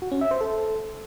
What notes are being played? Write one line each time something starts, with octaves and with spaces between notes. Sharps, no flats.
F#4
C#4
E5
C5
A4